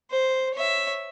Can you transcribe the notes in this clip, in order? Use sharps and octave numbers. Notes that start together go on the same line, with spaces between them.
C5
C#5 E5